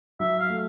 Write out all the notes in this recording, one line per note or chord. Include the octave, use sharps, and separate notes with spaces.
F#3 E5
F5
A3